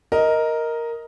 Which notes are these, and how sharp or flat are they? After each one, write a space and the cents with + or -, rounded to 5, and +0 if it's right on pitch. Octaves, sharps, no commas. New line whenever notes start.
A#4 +0 D#5 +10